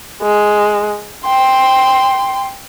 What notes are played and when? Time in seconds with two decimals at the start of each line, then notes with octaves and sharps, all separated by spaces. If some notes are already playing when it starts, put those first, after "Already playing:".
0.22 G#3
1.25 G5 C6